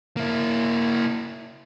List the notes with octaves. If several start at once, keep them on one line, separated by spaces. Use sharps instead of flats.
A#3 E4